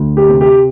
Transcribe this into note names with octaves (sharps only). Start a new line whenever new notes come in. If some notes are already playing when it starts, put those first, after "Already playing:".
Already playing: D2
G4
C3
G4